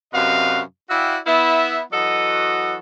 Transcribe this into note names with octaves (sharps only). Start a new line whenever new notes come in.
F#2 C3 F#4 B4 D#5 F5
E4 F#4 D5 E5 F5 G5
B3 E4 E5
E3 F#3 F#4 A4 D#5